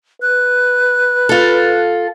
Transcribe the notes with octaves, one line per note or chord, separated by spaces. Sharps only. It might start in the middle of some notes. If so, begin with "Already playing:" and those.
B4 F#6
F4 A4